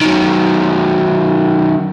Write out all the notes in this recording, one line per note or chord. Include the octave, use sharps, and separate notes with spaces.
D#3 F#3